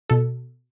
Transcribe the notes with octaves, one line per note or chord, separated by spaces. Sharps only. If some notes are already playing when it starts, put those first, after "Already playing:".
B2 A4